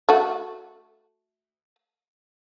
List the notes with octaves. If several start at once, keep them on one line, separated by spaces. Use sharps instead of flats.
A3 F#4